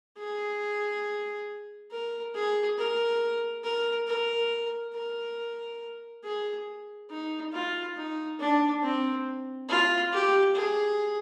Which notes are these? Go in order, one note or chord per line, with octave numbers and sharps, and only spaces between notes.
G#4
A#4
G#4
A#4
A#4
A#4
A#4
G#4
D#4
F4
D#4
D4
C4
F4
G4
G#4